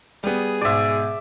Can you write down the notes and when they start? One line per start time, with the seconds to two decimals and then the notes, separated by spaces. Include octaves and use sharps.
0.24 G3 B3 G#4
0.61 G#2 B2 D5 E5